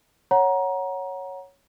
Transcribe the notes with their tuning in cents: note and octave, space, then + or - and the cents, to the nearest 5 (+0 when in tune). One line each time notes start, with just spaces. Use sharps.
C#5 +0 F#5 +0 A#5 +20